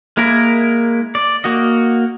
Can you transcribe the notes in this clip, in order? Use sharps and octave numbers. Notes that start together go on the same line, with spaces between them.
G#3 A#3 E4 A#4
D5
A#3 F#4 D#5